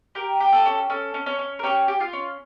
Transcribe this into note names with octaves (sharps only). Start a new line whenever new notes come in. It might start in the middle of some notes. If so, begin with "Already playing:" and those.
G4 A#4
G4
A4
C#4
C#4 A4
C#4
C#4 C#5
C#4
A#4
C#4 G4 C#5
G4
F4 F5
C#4